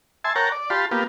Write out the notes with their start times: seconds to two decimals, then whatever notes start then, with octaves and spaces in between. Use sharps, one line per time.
0.24 E5 G#5 A5 C6
0.36 A#4 C#5 F#5 G5 A5 A#5
0.52 D5
0.70 F4 G4 A5 B5 C6
0.91 A#3 B3 F4 G4